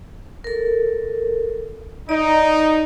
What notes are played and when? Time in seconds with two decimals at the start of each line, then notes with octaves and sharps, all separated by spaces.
0.44 A4 A#4
2.09 D#4 D5